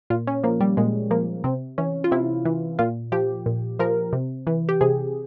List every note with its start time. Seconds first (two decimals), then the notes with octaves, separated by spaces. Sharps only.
0.10 A#2 F4
0.27 C#4
0.44 F3 A#3
0.61 G3
0.77 A#2 G#3
1.11 F3 A#3
1.44 C3 C4
1.78 E3 C#4
2.04 F4
2.12 C3 E4
2.45 E3
2.79 A#2 F4
3.12 F3 G4
3.46 A#2
3.79 F3 A#4
4.13 C3
4.47 E3
4.69 G4
4.81 C3 G#4